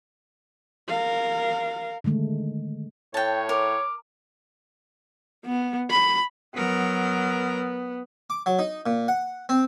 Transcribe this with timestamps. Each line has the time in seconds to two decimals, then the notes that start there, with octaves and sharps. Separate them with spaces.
0.89 A#4 F5
2.04 D3 D#3 G#3 A3
3.14 A2 C#5 G5 A5
3.49 A#4 D6
5.46 B3
5.90 B5
6.55 F#3 B3 A#4
8.30 D6
8.46 F#3
8.59 D#4
8.86 A#2
9.08 F#5
9.49 C4